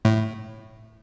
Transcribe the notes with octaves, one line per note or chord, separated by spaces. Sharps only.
A2